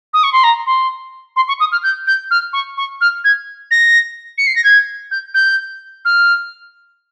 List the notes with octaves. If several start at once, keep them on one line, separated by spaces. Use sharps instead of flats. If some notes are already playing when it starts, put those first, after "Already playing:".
D#6
C#6
C6
A#5
C6
C6
C#6
D#6
F6
G6
G6
F6
C#6
C#6
F6
G#6
A#6
C#7
C7
A#6
G#6
G6
G6
F6